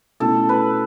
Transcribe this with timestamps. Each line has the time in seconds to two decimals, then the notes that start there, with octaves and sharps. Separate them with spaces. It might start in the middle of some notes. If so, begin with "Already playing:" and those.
0.20 B2 A3 C#4 E4 A4
0.49 B4